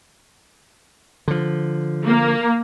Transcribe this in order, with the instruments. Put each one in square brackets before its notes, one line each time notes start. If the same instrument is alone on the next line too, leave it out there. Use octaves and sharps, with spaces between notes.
[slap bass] D3 F3
[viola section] A#3